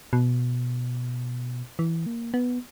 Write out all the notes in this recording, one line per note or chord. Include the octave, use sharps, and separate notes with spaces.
B2
E3
A#3
B3